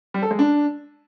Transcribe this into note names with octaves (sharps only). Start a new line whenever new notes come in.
G3
A4
G#3
D4